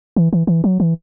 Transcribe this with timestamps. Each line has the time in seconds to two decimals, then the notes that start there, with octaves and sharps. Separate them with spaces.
0.16 E3
0.33 E3
0.47 E3
0.64 F#3
0.80 E3